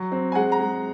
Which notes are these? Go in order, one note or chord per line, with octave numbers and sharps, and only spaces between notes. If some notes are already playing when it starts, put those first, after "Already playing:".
Already playing: F#3
C4
G#5
G#3 F#5
A#5
G#3